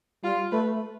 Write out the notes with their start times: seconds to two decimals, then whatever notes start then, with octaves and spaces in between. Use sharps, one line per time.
0.23 G3 F4
0.52 A3 B4